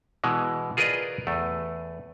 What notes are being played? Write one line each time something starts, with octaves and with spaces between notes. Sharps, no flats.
B2 E3 G#3
F4 G#4 A#4 B4 D5 D#5
E2 A3